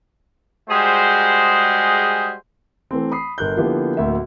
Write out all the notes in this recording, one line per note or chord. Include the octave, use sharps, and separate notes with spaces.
G3 G#3 F#4 G#4 C5
E3 A3 C4
B5 D#6 C7
G1 A#4 F#6 G6
D3 F3 A#3 B3 E4 G4
D1 D2 A#3 E5